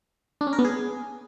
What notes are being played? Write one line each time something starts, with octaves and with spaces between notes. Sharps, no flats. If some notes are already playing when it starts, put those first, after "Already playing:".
D4
C#4
A#4
B3
G#4